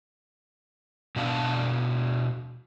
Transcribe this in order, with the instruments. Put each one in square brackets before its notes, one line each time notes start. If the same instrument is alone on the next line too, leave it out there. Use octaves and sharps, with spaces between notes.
[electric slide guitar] B2 B3 D4 D5 F5 A5